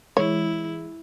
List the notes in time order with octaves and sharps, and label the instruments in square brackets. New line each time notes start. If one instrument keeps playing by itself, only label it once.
[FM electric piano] E3 G#3 [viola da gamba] E4 [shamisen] C#5